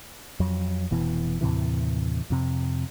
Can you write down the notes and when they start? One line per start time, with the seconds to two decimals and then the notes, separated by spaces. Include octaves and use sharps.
0.40 F2 F#3
0.91 F1 B2 E3
1.41 D#2 A2 C3 E3
2.30 F2 C3